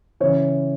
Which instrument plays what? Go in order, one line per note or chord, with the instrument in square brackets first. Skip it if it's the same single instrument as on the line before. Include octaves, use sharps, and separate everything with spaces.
[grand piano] C#3 E3 C#5